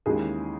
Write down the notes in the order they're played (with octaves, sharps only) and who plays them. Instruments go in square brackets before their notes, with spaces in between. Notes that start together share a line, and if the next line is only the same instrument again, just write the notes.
[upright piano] D#2 C#3 E3 G#3 G#4